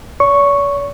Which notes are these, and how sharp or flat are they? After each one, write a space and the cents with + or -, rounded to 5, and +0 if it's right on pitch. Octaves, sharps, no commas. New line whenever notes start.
C#5 +45 C#6 +0